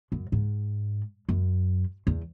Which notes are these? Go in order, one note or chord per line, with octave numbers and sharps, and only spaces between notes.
F#2
G#2
F#2
E2